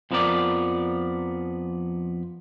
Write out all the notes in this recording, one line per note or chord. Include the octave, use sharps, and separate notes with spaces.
F2 F3 B3 A#4 D5